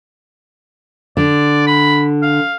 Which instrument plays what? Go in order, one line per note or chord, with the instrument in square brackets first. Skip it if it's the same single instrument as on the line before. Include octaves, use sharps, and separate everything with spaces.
[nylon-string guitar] D3 [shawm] D5
[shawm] B5
F5